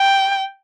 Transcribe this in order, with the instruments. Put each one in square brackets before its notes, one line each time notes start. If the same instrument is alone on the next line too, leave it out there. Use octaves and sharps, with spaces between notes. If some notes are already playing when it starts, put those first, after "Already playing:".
Already playing: [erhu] G5